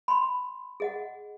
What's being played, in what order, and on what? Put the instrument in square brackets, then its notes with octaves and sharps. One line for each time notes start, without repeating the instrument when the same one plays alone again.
[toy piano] B5 C6
G#4 D#5 F#5